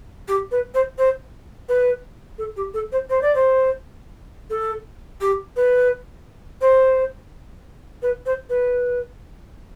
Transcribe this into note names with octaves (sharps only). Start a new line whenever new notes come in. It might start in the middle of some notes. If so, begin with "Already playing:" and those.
G4
B4
C5
C5
B4
A4
G4
A4
C5
C5
D5
C5
A4
G4
B4
C5
B4
C5
B4